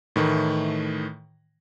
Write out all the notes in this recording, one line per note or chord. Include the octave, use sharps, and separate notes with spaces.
A2 D#3 E3 A3